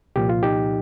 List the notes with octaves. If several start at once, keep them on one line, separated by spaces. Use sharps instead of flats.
C2 A#2 F3 G4
F4
D#4 G4